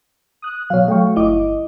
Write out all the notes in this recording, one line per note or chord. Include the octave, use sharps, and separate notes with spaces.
D#6 F#6
B2 F#3 C#5 F5
F#3 A3 F5 G5 C#6
G1 E4 D#5 D6